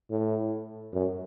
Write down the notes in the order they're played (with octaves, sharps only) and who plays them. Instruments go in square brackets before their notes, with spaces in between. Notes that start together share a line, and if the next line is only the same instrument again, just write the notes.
[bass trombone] A2
F#2